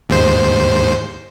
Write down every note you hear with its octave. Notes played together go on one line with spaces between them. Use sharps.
D#2 G#2 C5